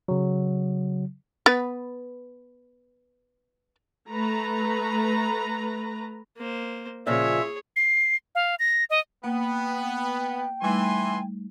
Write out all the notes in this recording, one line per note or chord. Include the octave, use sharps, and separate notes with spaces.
C#3 F#3
B3 B4
A3 B4 A#5
A#3 C5
A#2 C#3 F3 G#4 C#5 E5
C7
F5
A#6
D#5
A#3 B3 G5
E3 G3 A3 D#4 G#5 C6